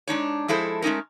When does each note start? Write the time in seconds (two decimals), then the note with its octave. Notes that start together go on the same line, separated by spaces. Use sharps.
0.08 G#3 D4 D#4 C#5
0.48 F3 G#3 E4 A4 C5
0.82 G#3 A3 C#4 D#4 A#4